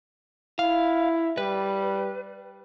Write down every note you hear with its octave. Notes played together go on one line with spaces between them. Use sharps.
E4 F5
G3 B4